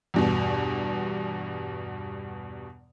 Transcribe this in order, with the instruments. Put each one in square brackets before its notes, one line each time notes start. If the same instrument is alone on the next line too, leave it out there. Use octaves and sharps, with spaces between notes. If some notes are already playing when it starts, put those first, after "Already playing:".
[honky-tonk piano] E2 G2 B2